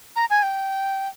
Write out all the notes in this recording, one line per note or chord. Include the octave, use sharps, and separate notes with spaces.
A#5
G#5
G5